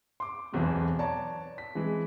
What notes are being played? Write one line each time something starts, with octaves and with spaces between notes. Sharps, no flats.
C6 D6
E1 B1 E2 E3 C4
C#5 D5 A5 A#5
B6
E3 G#3 C4